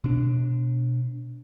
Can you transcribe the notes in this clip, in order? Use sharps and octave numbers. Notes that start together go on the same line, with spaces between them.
B2 D4